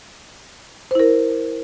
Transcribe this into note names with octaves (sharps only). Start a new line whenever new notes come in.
E4 A#4 C5